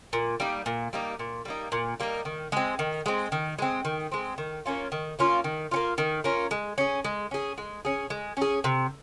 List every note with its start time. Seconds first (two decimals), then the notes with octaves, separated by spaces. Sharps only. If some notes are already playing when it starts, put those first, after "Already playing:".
0.13 A#2
0.40 G3 A#3 D#4
0.66 A#2
0.93 G3 A#3 D#4
1.19 A#2
1.45 G3 A#3 D#4
1.72 A#2
2.00 G3 A#3 D#4
2.25 D#3
2.52 G#3 C4
2.79 D#3
3.06 G#3 C4
3.32 D#3
3.59 G#3 C4
3.85 D#3
4.12 G#3 C4
4.38 D#3
4.66 A#3 C#4 F4
4.92 D#3
5.19 A#3 C#4 F4
5.44 D#3
5.71 A#3 C#4 F4
5.98 D#3
6.24 A#3 C#4 F4
6.51 G#3
6.78 C#4 G#4
7.04 G#3
7.31 C#4 G#4
7.58 G#3
7.85 C#4 G#4
8.10 G#3
8.37 C#4 G#4
8.64 C3